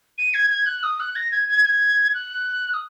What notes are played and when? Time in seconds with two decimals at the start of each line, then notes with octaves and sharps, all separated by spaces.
0.18 D#7
0.34 G#6
0.50 G#6
0.66 F#6
0.83 D#6
1.00 F#6
1.16 A#6
1.31 G#6
1.48 G#6
1.64 G#6
2.14 F#6
2.74 D#6